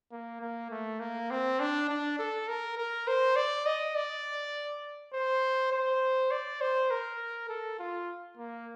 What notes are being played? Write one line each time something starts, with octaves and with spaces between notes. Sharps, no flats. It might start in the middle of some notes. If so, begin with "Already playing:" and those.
A#3
A#3
A3
A#3
C4
D4
D4
A4
A#4
A#4
C5
D5
D#5
D5
C5
C5
D5
C5
A#4
A4
F4
A#3